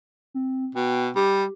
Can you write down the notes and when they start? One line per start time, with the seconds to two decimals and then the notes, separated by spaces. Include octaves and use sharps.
0.34 C4
0.75 B2 G5
1.16 G3 G4